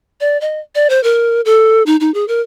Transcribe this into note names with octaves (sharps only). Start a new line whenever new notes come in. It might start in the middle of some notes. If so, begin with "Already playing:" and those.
D5
D#5
D5
C5
A#4
A4
D#4
D#4
G#4
A#4